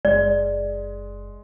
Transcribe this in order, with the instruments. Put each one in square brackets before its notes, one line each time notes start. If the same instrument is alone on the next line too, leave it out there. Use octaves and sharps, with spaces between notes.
[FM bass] F#1 [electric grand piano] G#3 [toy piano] D5